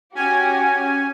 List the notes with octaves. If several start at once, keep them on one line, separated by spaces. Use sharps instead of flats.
C#4 F#4 G4 G#5